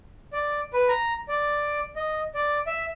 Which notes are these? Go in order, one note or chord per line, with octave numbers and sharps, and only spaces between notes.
D5
B4
A#5
D5
D#5
D5
E5